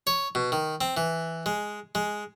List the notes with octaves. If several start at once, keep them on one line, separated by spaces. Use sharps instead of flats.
C#5
B2
D#3
C4
E3
G#3
G#3